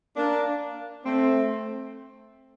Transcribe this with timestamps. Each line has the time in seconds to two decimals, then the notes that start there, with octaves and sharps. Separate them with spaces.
0.16 A#3 D4
1.04 A3 C4